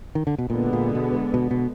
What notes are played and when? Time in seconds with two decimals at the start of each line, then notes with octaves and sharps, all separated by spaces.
0.15 D#3
0.27 D3
0.38 B2
0.49 A#2 D3 G#3 B3
0.73 A#2
0.95 B2
1.34 B2
1.51 B2